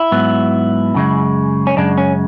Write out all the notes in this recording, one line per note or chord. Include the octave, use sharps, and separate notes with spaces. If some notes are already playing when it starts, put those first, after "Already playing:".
Already playing: E4
G#2 F#3 B3
F#2 C#3 G#3
C#4
F#2 C#3 G#3 D4
C#4